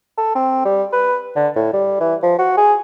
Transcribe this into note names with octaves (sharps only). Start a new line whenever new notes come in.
A4
C4
G3
B4
D3
A2
G3
E3
F3
F#4
G#4